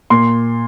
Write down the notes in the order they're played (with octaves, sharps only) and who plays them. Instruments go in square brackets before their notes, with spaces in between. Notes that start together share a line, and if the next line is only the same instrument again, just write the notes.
[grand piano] A#2 C6